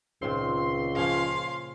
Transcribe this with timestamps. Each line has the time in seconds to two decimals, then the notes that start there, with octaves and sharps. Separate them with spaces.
0.22 C#2 A#2 D#3 C4 C6
0.96 C#3 F3 C#4 F5